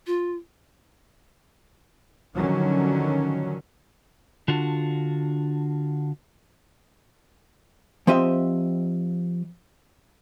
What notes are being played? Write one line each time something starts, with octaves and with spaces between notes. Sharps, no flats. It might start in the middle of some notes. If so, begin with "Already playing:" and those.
F4
D3 D#3 F3 F#3 C#4
D3 D4 F4 F#4
F3 C4 G4 D#5 E5